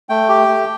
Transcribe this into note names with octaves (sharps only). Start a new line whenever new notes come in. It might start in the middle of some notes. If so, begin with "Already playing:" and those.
A3 G5
G4
A3